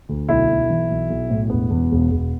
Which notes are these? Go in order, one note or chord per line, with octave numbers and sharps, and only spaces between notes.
D2
B1 E4
B1
E3
B1
B1
A2
E1 B3
E2
E1
E1